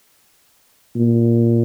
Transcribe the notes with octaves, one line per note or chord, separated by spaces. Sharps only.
A#2